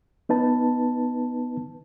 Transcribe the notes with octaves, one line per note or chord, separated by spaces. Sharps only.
B3 D#4 B4 A5